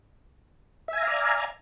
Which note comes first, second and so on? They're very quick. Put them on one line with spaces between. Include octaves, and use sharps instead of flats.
E5 G#5 A#5 F5 D5